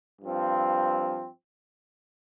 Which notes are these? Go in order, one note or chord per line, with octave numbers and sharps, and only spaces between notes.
G2 F3 C4